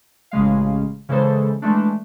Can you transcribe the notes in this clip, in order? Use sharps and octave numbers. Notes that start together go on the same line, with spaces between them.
A1 C#3 G#3 F5
C#3 E3 G#3 A4 C5
E3 G#3 A3 D4